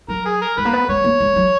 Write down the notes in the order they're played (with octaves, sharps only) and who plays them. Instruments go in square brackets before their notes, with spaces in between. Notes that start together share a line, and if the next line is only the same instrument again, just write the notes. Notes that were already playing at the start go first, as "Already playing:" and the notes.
[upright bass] F#3 [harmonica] A#4
[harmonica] G#4
A#4
[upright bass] G#3 [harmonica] B4
[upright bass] A#3
B3
[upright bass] G#3 [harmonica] C#5
[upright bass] A#3
G#3
F#3